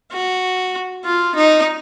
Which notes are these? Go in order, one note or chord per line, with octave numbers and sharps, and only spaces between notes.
F#4
F4
D#4